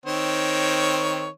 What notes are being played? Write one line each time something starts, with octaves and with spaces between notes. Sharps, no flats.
D#3 C4 C#5